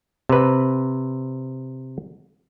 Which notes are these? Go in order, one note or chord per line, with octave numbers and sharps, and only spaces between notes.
C3 B4